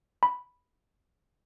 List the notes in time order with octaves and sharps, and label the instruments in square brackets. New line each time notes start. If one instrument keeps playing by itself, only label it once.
[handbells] B5